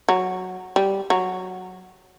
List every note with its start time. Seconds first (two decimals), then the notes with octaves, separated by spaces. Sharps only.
0.09 F#3
0.76 G3
1.10 F#3